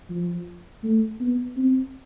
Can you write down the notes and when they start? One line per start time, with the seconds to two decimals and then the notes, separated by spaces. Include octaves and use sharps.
0.10 F3
0.84 A3
1.21 B3
1.57 C4